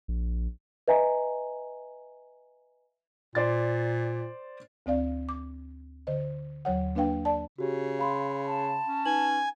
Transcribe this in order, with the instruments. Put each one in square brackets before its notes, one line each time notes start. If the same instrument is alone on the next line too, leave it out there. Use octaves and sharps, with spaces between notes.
[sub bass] A#1
[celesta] B4 D#5 E5 G#5 A#5
[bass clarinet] A#2 [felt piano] C5 D5 A6
[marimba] D2 C4 D5 F5
D6
D3 C5 D#5
D#2 F#3 C#5 F#5
A#3 D4 B4 F5 G5
D5 A5
[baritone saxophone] C#3 [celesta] F#4 G4
[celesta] F5 B5 C6
[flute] A5
[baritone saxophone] C#4
[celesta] D#4 B4 F#7 [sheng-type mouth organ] G#5